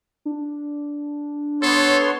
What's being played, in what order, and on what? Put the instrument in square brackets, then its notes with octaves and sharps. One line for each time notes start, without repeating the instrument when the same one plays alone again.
[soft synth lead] D4
[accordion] B3 C#5 C6 [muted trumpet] A4